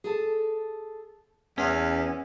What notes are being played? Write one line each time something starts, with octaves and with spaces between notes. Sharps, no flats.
G#4 A4 A5
E2 B3 C#4